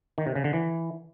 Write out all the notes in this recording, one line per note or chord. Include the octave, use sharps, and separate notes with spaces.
D#3
C3
C#3
D3
E3